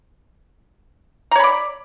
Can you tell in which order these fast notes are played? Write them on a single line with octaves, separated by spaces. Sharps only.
A#5 C#5 B5 D5